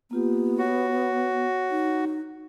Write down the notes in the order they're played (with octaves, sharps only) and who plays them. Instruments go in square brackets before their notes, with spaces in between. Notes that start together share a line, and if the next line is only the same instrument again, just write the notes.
[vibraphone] A#3 F4 G4 [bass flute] B3
[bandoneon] F#4 [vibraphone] C#5
[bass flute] D#4